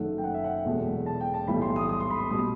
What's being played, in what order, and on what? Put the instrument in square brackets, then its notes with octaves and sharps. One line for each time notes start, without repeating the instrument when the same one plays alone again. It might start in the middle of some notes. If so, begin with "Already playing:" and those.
Already playing: [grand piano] F#1 F#2 D#3 F#3 A3 F#5
G5
F#5
E5
F#5
E1 E2 B2 F#3 A3
A5
G5
A5
B1 A2 E3 G3 B5
C6
D#6
D#6
C6
B5
C6
B2 G3 D#6